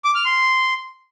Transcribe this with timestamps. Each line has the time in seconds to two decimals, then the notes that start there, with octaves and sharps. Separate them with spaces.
0.05 D6
0.15 F6
0.25 C6